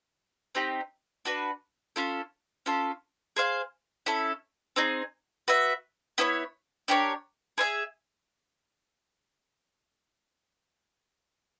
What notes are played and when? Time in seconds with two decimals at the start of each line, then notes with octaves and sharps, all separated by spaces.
0.55 C4 D#4 G4
1.25 D4 F#4 B4
1.96 C#4 F4 A4
2.66 C#4 F4 A4
3.36 G#4 C5 F5
4.06 C#4 E4 A4
4.76 C4 D#4 G#4
5.48 F#4 B4 E5
6.18 B3 E4 A4 C#5
6.88 D4 G4 A#4 C#5
7.58 G#4 C5 E5 G#5